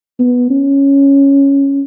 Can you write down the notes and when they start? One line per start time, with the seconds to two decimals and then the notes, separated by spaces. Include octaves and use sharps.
0.19 B3
0.50 C#4